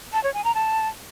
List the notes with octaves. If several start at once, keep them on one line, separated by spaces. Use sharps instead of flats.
A5
C#5
G#5
A#5
A5